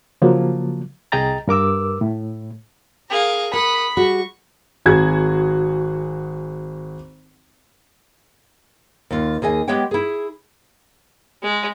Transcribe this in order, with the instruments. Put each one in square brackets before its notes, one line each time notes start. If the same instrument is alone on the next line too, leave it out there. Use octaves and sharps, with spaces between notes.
[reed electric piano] C#3 F3 F#3 A#3
C2 G#4 D#5 G5 A#5 A6
G2 A#4 D6 E6
A2
[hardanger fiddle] G#4 [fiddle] A#4 F5
[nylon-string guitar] A#4 [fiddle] F#5 D#6 [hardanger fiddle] B5
[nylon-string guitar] G3 F#4 G#4 [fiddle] C#6
[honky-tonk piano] G#1 F#4 G#4 G#6
[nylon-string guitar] D#2 F4
D#2 G#4 D#5 G#5
G#3 B3 G4 C#5 F#5 G5
E4 G#4
[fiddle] G#3